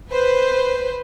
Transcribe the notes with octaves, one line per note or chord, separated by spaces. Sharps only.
B4 C5